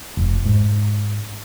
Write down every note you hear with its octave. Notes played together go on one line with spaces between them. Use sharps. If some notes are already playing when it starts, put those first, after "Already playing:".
F1
G#2